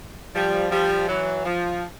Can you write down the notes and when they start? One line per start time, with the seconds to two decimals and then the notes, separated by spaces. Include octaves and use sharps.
0.34 F3 G3
0.71 F3 G3
1.08 E3 F#3
1.45 F3